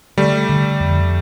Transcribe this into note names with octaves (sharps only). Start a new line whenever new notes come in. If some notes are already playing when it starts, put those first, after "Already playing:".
D3 G3 A3
D3
F2